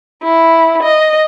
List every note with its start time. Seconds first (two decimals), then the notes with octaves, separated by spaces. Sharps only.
0.24 E4
0.83 D#5